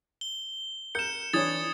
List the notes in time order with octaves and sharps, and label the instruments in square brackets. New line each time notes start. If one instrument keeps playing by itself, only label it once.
[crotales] G7
[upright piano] A#4 G6 [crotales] C#7 E7
[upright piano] E3 D4 C#5 [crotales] D#6 G#6 A6